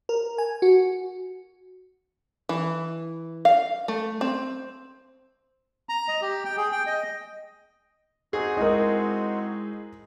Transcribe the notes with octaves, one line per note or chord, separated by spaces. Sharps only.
A#4
G#5
F#4
E3
F5
A3
C4
A#5
D#5
G4
G5
G#4
G5
D#5
C4 D#4 F#4 G#4
G#3 E4 A#4 D#5